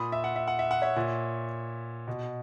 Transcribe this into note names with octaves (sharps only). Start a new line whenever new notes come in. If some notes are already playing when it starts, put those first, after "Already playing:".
Already playing: A#2 B5 D#6
E5
F#5
E5
F#5
E5
F#5
C#5 E5
A#2
B2